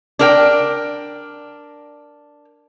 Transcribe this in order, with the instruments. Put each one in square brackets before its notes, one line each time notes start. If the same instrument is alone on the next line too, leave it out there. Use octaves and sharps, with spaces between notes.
[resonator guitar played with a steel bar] D4 A#4 G5